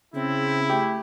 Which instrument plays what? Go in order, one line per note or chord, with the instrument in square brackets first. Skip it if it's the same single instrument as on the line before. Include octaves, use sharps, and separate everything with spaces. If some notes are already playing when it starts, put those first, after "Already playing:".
[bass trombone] C#3 [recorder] C4 [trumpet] E4
[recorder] A3 [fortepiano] G4